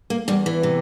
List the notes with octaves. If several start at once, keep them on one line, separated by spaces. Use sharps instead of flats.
A#3
E2 G3
E3
C3